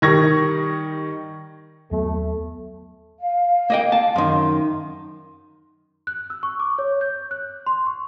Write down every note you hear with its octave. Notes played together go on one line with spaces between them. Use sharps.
D#3 G3 D#4 C#6 G#6 A#6
D#2 F#3 A3 B3
F5
A#3 D#5 G5
A5
F#2 D#3 C6
F#6
E6
C#6
D6
C#5
G6
F#6
C6
C#6